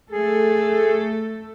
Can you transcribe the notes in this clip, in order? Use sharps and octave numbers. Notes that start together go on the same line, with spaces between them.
A3 G#4 A4